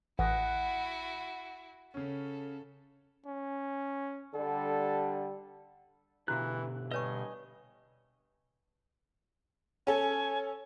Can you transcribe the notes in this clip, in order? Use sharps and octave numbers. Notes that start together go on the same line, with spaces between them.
A1 E4 F#4 F#5 G#5 D#6 A#6
C#3 C#4 A4
C#4
D3 G3 A4
B2 D3 E3 E4 F#4 G4 F5 F#6
G2 B4 C#5 D#5 G#5 C#6
C#4 A4 G#5